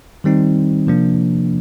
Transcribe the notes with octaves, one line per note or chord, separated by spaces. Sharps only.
D#3 G3 C4 D#4
C3 F3 A#3 D4